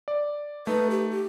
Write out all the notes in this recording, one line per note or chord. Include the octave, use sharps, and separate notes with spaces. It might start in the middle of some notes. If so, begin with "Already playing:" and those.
D5
A3 D#4 B4
G4
G4